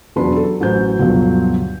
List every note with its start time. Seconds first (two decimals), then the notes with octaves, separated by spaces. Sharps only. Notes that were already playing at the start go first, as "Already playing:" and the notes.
0.16 E1 F#2 D4 B4 B5 C6
0.36 F#3 A4
0.60 A1 F#2 C5 G6
0.99 D2 G2 B2 F3 F#3